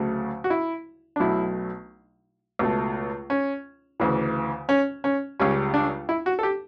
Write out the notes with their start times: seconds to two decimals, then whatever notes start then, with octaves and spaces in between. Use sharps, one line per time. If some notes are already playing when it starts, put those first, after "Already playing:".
Already playing: D2 C#3 F#3 A3
0.44 F#4
0.50 E4
1.16 D4
1.20 B1 B2 F#3 A3 E4
2.59 C#2 B2 A3
3.30 C#4
4.00 D2 C#3 E3
4.69 C#4
5.04 C#4
5.39 C#2 C#3 G3 C#4
5.74 D4
6.09 E4
6.26 F#4
6.39 A4
6.43 G4